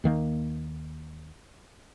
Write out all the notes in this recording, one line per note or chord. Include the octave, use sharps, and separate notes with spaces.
D#2 D#3 A#3